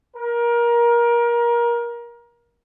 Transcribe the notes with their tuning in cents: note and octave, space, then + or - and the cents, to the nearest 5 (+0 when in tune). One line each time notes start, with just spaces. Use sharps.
A#4 +25